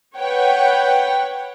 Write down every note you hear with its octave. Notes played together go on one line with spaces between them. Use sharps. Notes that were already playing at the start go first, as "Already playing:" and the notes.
B4 C#5 F#5 G5